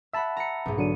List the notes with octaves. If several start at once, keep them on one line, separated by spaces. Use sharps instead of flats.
E5 F#5 A5 B5 E6
A#5 B5 C#7
B1 G#2
D3 F#3 D4 C#7 D#7